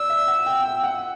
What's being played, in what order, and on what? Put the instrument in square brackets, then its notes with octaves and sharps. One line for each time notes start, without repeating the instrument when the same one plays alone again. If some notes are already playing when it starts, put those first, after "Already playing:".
Already playing: [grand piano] D5 [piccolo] E6
[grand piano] E5
F#5
G5
G5
F#5